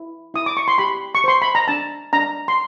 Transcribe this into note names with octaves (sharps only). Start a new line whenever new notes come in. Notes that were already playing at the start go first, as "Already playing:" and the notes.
Already playing: E4
E4 D#6
D6
C#6
C6
G4 B5
C#6
C5 C6
B5
A#5
D4 A5
D4 A#5
C6